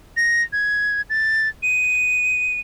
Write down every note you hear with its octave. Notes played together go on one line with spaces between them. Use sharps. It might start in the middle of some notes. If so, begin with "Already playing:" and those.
A#6
G#6
A6
D#7